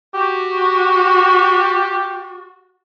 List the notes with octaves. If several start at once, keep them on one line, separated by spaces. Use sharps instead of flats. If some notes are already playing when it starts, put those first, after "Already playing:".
F#4 G4